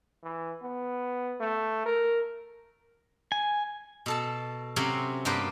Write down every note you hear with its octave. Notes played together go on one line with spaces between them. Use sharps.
E3
B3
A3
A#4
G#5
B2 A4 A5
C3 F#3 C4 C#4
G2 A#3 B3 G4 B4 C5